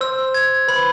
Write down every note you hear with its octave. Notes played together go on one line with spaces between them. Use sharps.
C5 E6
G#6
B4 B5